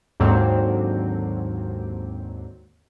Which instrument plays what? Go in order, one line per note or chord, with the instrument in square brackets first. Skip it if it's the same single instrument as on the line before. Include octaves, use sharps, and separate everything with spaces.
[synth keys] D#2 G#2 D3 F#3 A#3 C4